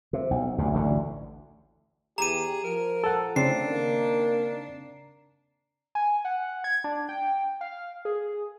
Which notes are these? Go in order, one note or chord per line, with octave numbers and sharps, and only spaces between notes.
C3
B1
D2 G2 C#3
A1 D2 A2 D3
E2 G4 G#4 A#5 D#7
F3 A#4
A4 F#5
A2 C#3 C4 D4 C7
D#3 A#3
G#5
F#5
G#6
D4
G5
F5
G#4